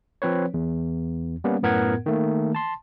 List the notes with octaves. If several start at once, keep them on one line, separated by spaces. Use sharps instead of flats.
F3 C4 B4 C#5
E2
G3 A#3 B3 C#4
F#2 A2 B3 A#4 F#5 G#6
D#3 A3 A#3
A5 C6